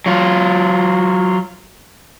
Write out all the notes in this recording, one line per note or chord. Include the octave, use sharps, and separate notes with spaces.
F#3 F4